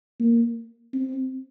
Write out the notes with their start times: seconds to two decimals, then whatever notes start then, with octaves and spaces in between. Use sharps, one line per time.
0.20 A#3
0.93 C4